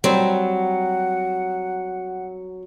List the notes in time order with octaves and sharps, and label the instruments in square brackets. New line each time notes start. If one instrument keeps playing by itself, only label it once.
[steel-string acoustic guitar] F#3 [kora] G3 C4 [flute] F#5